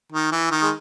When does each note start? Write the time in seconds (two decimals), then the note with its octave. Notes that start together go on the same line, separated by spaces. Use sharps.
0.13 D#3
0.32 E3
0.51 D#3
0.62 G#3